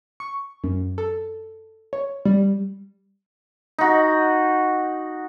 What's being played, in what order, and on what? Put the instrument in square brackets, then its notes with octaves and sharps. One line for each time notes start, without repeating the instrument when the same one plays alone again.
[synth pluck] C#6
F#2
A4
C#5
G3
[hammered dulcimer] D#4 F#4